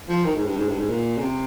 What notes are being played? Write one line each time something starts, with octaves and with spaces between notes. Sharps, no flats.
F3
D#3
G#2
G2
G#2
G2
G#2
A#2
C#3
C3